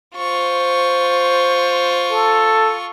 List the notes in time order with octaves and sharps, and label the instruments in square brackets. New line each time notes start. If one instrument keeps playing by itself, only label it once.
[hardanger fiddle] F4 C#6 [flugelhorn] C5
[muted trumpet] A4